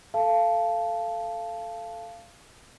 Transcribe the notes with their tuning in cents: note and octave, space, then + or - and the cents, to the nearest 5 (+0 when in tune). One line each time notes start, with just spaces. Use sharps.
A4 +0 F5 -15 A5 -10